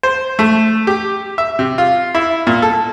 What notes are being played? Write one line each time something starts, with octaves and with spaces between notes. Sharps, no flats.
C5
A3
G4
E5
C3
F4
E4
A#2
A4